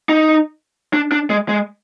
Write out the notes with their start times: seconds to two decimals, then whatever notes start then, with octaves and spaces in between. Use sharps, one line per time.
0.09 D#4
0.94 D4
1.12 D4
1.30 G#3
1.49 G#3